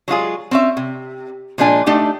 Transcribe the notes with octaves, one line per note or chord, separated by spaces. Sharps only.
F#3 G#3 F4 G#4
C4 C#4 E5
C3
A#2 F3 G#3 D4 G#5
A3 D4 D#4 G4